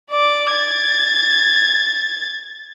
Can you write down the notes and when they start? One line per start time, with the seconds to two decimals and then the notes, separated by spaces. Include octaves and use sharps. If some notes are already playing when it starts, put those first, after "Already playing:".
0.11 D5 D6
0.52 G#6 A6